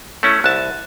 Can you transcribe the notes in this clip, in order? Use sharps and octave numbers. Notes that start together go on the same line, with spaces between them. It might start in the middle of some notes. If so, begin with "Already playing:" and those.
A3 C#4 E4
C2 A5 F#6